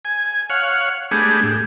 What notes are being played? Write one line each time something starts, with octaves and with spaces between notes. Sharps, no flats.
G#5
C#5 F5 F#5
G#3 A3 B3 D4 G4 G#4
A2 G4 G#4